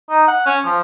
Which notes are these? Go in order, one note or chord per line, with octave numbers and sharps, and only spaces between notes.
D#4
F#5
C#4
F3